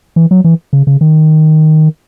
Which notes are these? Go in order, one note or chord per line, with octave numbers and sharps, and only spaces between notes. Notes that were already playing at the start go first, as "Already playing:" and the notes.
E3
F#3
E3
C#3
C#3
D#3